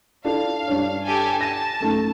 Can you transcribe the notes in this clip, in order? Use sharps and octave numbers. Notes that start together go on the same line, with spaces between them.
D4 E4 A4 F5
G2 D4 C#5
G4 A4 G#5
A5 A#6 D#7
F#2 A3 D#4